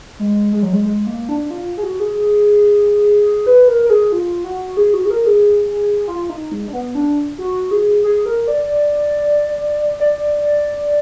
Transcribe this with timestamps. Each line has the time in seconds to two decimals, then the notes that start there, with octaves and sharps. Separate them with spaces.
0.19 G#3
0.52 G#3
0.63 F#3
0.73 G#3
0.85 G#3
1.07 A#3
1.29 D4
1.51 F4
1.77 G#4
1.83 F#4
2.00 G#4
3.46 B4
3.68 A#4
3.85 A#4
3.90 G#4
4.12 F4
4.44 F#4
4.77 G#4
4.94 F#4
5.05 G#4
5.10 A#4
5.26 G#4
6.08 F4
6.30 D#4
6.52 G#3
6.68 D4
6.73 B3
6.95 D4
7.38 F#4
7.71 G#4
8.04 G#4
8.26 A#4
8.48 D5
10.00 D5